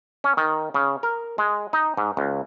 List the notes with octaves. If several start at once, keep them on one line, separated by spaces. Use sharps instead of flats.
C#4
D#3
C#3
A#4
G#3
D#4
G#2
C#2